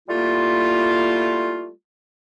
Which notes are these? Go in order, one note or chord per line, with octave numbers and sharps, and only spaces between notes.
G3 A3 A#3 E4 F4